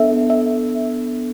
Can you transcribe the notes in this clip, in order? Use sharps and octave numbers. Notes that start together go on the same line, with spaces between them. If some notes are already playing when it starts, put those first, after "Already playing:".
Already playing: B3 D4 A4 E5
E5